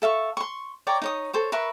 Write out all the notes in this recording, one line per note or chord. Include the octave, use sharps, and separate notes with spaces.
A4 E5 F5 C#6
C6 C#6
C#5 D5 G5 A#5
D#4 C#5 D#6
A4 C5 C#5
A#4 B4 E5 C#6